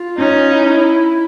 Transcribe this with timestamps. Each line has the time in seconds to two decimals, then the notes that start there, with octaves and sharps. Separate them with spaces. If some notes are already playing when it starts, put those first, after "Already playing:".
Already playing: F4
0.18 C#4 D#4
0.51 E4